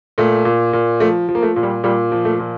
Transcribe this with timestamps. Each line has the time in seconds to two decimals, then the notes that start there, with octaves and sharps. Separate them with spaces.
0.18 A#2 A3
0.45 A#2
0.73 A#2
1.00 F3 A3
1.29 F3
1.35 A#3
1.43 A3
1.56 A#2
1.63 G3
1.84 A#2 G3
2.12 F3
2.25 A3
2.39 A#2